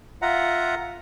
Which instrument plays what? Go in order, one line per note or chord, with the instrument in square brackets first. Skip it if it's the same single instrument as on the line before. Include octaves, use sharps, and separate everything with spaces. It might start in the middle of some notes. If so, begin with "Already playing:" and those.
[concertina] F4 E5 F#5 A#5